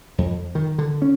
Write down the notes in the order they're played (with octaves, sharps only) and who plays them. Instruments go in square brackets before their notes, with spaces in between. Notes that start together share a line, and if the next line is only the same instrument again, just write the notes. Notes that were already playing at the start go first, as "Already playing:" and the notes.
[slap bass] F2
D#3
D3
C#4